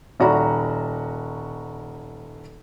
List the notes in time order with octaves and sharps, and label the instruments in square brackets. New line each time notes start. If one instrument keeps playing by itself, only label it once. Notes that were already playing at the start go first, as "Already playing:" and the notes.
[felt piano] D#1 F#4 D5 A#5 B5